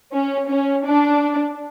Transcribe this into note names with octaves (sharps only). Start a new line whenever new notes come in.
C#4
C#4
D4